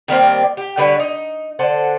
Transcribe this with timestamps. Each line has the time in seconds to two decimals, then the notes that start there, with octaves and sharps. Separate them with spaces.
0.08 D#3 G3 A#3 C4
0.57 G4
0.77 D3 G3 B4 C#5
1.00 D#4
1.59 D3 A4 C5 F#5